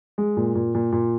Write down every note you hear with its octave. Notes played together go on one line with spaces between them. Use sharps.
G#3
A#2
A#2
A#2
A#2